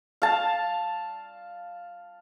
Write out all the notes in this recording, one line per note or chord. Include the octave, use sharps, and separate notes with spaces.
F5 A5